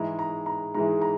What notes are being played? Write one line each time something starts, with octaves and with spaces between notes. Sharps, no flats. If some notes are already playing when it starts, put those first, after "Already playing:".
Already playing: G#2 E3 G#3 E4 A#5
A#5
A#5
G#2 E3 G#3 E4 A#5
A#5